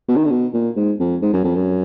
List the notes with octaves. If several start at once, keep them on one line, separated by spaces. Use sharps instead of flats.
B2
D#3
D3
B2
A#2
G#2
F2
G#2
F#2
F2
F#2